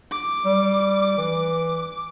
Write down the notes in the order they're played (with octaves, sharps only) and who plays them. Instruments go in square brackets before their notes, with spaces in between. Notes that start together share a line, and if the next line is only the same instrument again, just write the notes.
[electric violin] D6
[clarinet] G3
E3